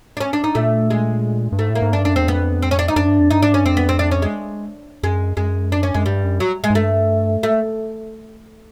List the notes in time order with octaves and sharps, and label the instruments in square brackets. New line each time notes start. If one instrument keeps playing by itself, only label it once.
[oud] D4
C#4
D4
D#4
[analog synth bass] A#2 [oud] A3
[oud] G#3
[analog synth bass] G2
[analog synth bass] G#2 [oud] A3
[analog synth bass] A2
[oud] A#3
[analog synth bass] G#2
[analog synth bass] G2 [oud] D4
[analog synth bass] F#2 [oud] D4
[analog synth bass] E2 [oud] C4
[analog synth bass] F2 [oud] B3
[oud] C4
C#4
D4
D#4
[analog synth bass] F#2 [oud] D4
[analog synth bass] G2
F2
[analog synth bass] G2 [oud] D#4
[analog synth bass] G#2 [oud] D4
[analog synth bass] G2 [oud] C#4
[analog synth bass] F2 [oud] C4
[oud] B3
C4
D4
C#4
G#3
[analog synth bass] F#2 [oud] G#3
[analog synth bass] F#2 [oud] G#3
[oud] D4
C#4
[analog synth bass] F#2 [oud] G#3
[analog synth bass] G2 [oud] G3
[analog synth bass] F#2
[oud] F#3
G#3
[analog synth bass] G#2
[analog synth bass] G2 [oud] A3
[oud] A3